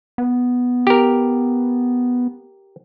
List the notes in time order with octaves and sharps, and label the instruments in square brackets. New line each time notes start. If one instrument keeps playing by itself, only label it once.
[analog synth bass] B3
[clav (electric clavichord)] G4 A#4